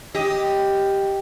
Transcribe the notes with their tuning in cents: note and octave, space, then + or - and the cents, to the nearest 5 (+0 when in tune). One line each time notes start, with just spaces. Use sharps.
G4 +0 D#5 +0